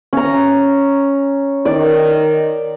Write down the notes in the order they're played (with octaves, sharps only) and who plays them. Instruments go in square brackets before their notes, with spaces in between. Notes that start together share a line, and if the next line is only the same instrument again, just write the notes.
[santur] C#4 A#5
[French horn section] D#3 [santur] D5